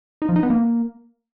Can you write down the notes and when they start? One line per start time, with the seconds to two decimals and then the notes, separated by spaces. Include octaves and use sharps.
0.22 D#4
0.29 F3
0.36 D#4
0.43 B3
0.50 A#3